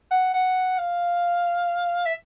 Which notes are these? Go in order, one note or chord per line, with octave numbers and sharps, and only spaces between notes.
F#5
F#5
F5
E5